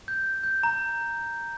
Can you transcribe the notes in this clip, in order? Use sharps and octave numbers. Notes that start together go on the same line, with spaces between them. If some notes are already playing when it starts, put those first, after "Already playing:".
G6
G6
A#5